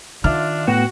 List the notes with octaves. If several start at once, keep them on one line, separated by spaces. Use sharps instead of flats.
D#3 D4 F4 E5 F6
A2 B3 F#4 G5